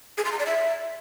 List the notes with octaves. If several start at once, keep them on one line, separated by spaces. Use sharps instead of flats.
G#4
C6
A#5
D5
E5